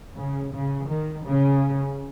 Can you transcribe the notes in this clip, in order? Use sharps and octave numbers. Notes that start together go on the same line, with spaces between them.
C#3
C#3
D#3
C#3